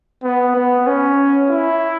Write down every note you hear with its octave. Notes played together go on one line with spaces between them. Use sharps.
B3
B3
C#4
E4